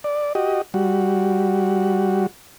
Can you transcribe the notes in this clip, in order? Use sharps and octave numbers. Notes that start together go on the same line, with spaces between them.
D5
F#4 G4 D#5
G3 F#4